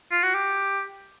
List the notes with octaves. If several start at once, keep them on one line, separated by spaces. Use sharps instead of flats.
F4
F#4
G4